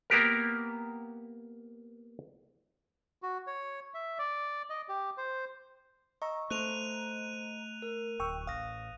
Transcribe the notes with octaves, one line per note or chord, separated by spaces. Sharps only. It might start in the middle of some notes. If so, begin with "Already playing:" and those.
A#3 B3 G4 A#4
F#4
C#5
E5
D5
D#5
G4
C5
D#5 A#5 C#6 E6
A3 C5 C6 F#6 D#7 F7
A#4
D1 G5 C#6 E6
A1 F5 D#6 A#6